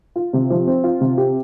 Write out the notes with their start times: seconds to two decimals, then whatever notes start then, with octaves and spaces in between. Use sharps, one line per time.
0.16 F4
0.33 C3
0.50 F3
0.67 C4
0.84 F4
1.01 C3
1.18 G4